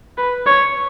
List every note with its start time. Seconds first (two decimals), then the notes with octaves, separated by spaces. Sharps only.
0.18 B4
0.46 C#5